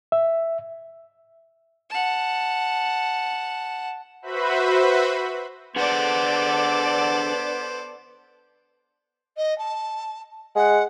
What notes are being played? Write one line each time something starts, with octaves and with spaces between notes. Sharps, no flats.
E5
F#5 A5
F#4 B4 C5 E5 B5
B3 D4 G#4 A4 C5 D5 F#5
D#5
A5
G#3 F#5